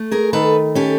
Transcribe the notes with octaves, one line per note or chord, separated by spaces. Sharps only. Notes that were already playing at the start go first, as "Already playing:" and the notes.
Already playing: A3
G#4 A#4
D#3 A4 B4
C#4 G4 A4